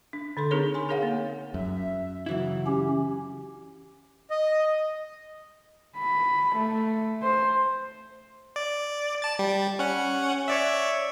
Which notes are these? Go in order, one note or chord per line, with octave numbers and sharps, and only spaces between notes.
D4
D3 A4 C6
C4 D#4 G#4 A#4 C#5
G#5 C6
G#4 A#4 C#5 F5 F#5
A#3
F#2 E5
C#3 E3 F#3 E4
C#4 G4
D#5
B5
A3
C5
D5
A5 A6
G3
C#4 F#5
C#5 D5 E5